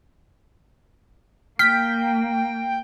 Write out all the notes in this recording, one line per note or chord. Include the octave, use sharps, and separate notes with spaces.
A#3 G5 F6 B6